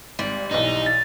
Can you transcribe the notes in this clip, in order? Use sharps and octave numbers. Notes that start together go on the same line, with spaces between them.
G#1 G3
B1 E3 D#4 D#5
A6